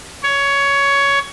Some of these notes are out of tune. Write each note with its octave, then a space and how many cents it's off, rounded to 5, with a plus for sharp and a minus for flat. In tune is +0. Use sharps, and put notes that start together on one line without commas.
C#5 +15